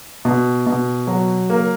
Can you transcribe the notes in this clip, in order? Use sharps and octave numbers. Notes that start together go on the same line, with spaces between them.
B2
B2
F#3
A#3